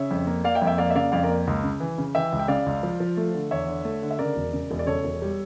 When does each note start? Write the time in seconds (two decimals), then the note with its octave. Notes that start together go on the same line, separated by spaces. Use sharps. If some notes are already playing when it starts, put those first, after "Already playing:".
Already playing: C#3 C#5 E5
0.11 F2
0.27 A#3
0.44 A#3 D5 F5
0.55 E5 G5
0.62 F2
0.67 E5 G5
0.78 A#3 D5 F5
0.90 E5
0.95 C#3 D5 F5
1.12 F2 D5 F5
1.23 A#4 D5
1.29 A#3
1.47 C#2
1.64 C#3
1.80 E3
1.98 C#3
2.15 E3 E5 G5
2.32 C#2
2.39 G5
2.48 C#3 D5 F5
2.66 C#2
2.83 F3
3.00 F3
3.17 A3
3.34 D3
3.51 E2 C#5 E5
3.67 D3
3.85 A3
4.02 D3
4.11 E5
4.19 C#3 A#4 D5
4.36 E1
4.53 C#3
4.71 E1
4.79 D5
4.87 C#3 A4 C#5
5.04 E1
5.22 G3